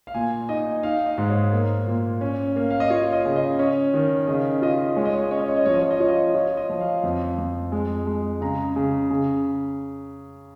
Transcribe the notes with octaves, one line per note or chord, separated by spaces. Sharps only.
F5
A#2 G#5
D#4 D#5
D#4 F5
D#5
G#2
C#5
A#3
A#2
C#4
A#3
F5
D#5
F4 C#5
D#5
C#3
D#5
C#4 C#5
D#3
C#3 D#5
F4 D#5
G#3 C#5
D#5
C#5
D#5
C#4 C#5
D#5
C#5
D#5
F3 C#5
D#5
C#5
D#5
F4 C#5
D#5
C#5
F4 C#5
D#5
F3
F5
F2
F2
G#3
G#3
C#3 A#5
C#3
C#3